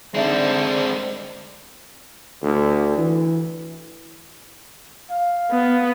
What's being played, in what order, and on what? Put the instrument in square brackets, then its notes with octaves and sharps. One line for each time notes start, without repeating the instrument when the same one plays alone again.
[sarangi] D3 [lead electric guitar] G#3 C4 [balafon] D#4 E5 [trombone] C5
[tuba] D2
E3
[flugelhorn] F5
[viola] B3